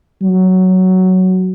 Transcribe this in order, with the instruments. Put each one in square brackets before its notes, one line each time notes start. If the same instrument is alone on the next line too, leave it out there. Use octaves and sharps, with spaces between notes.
[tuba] F#3